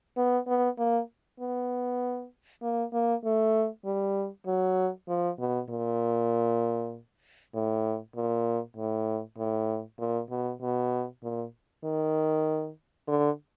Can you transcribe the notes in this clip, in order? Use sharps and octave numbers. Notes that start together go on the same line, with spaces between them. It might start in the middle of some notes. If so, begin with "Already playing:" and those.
B3
B3
A#3
B3
A#3
A#3
A3
G3
F#3
F3
B2
A#2
A2
A#2
A2
A2
A#2
B2
B2
A#2
D#3
D3